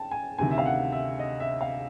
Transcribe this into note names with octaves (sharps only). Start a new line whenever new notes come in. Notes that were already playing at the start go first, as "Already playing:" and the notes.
Already playing: G5 A5
G#5
D2 C3 D#3 G#5
E5
F5
F#5
E5
D#5
E5
F5